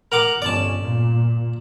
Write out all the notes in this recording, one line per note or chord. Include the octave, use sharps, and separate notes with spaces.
A#4 F#5 D6
G1 F2 C#4 D5 A5
A#2